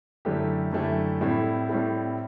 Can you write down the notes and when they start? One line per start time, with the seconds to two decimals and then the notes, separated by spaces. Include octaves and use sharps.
0.25 F#2 D3 A3 E4 G4
0.73 F#2 D3 A3 E4 G4
1.21 A2 G3 C4 E4 A4
1.69 A2 G3 C4 E4 A4